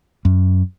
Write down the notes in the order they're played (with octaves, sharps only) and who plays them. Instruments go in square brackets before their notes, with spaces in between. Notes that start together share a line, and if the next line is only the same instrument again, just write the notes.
[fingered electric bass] F#2